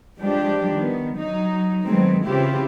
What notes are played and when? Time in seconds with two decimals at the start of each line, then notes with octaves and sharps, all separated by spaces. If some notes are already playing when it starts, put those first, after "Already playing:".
0.19 E3 F3 G3 G#3 D4 G4
0.74 D#3 B3
1.18 F#3 D#4
1.84 D#3 F#3 G#3 A3 B3 C4
2.25 C#3 E3 C4 E4 F4 G4